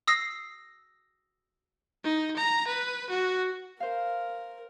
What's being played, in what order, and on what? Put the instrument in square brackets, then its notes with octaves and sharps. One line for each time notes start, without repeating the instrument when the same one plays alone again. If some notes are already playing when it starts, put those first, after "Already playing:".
[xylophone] D#6 E6 A#6 C7
[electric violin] D#4
A#5
B4
F#4
[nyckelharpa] A#4 [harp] C5 F5